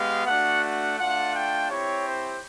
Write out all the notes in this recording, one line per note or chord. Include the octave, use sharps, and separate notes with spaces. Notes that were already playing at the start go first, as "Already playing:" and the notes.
Already playing: G#3 B3 G4 F5
A3 D4 F#4 F#5
F#5
A3 D4 F4 F#5
G5
C4 E4 G4 C#5
C5